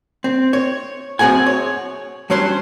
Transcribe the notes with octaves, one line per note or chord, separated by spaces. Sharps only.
C4
C#5
F#2 C4 G#4 F#5 G#5
C#5
G2 F#3 C#4 C5 C6